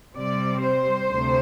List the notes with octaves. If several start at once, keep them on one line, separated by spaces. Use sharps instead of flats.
C3 G3 C4 D5
C5
D2 C3 A3